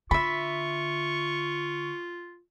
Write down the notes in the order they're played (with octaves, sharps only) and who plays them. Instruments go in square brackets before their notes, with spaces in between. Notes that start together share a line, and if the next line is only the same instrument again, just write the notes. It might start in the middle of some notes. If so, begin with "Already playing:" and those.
[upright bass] D3 [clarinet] F4 [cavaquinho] E5 B5 [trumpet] C#6